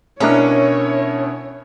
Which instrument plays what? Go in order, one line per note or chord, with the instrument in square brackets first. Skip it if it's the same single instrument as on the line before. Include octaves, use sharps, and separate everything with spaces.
[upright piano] B2 E4 [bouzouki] C#4 [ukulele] D4 A#4 D#5 [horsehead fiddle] C#5